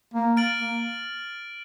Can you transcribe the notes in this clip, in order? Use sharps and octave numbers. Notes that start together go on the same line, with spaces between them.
A#3
F6 A6 D7 F#7
A#3